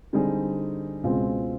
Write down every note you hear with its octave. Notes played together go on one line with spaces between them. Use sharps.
D3 G3 C4 D#4 G#4
C#2 B2 G#3 C4 F4